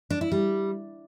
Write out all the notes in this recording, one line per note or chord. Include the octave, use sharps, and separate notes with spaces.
D4
E4
G3